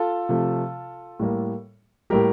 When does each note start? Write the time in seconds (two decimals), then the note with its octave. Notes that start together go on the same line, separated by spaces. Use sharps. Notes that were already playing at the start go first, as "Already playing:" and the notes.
Already playing: F4 A4
0.29 C3 F3 A3
1.20 A2 G3 A#3
2.10 A2 G3 A#3 G4 A#4